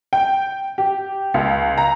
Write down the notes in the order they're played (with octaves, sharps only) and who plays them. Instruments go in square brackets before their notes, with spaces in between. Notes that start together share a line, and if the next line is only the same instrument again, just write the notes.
[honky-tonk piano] G5
G4
C#2
A#5